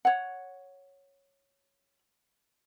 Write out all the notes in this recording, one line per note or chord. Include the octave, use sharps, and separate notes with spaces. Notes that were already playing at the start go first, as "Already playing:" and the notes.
C#5 F#5